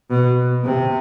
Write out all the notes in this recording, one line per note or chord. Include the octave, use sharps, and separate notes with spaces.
B2
C3